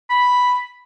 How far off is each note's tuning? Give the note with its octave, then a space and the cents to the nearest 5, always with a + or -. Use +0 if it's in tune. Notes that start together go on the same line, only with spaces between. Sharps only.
B5 +0